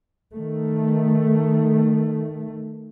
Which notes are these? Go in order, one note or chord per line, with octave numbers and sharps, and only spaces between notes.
D#3 A3